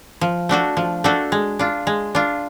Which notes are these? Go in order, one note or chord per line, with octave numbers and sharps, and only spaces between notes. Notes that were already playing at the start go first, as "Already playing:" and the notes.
F3
A3 D4 F#4 A4
F3
A3 D4 F#4 A4
G#3
D4 F4
G#3
D4 F4